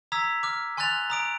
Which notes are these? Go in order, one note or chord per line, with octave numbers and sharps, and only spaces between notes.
A#5 D#6 E6 G#6 B6
D6 F6
G#5 C6 F6 F#6 A6 F7
A#5 D#6 D7